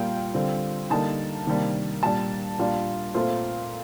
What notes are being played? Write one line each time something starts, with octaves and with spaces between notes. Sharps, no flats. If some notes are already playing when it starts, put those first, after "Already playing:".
Already playing: A#2 G3 A#3 F4 G5
D3 G3 C4 F4
D3 G3 A#3 D#4 A5
C3 D#3 G3 A#3 D4
A#2 G3 D4 A5
A#2 G3 D4 F4
A#2 A3 C4 F4 C5